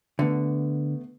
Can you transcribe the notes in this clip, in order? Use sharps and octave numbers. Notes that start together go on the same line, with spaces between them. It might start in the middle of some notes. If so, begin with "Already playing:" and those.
D3 A3 B3